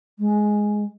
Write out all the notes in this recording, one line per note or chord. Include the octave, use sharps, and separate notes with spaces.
G#3